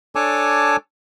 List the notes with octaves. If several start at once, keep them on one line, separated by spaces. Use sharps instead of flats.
D4 A4 C#5 G#5 A5 D6